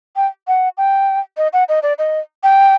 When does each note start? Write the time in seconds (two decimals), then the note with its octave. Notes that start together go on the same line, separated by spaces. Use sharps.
0.16 G5
0.48 F#5
0.78 G5
1.37 D#5
1.53 F#5
1.69 D#5
1.83 D5
1.98 D#5
2.43 G5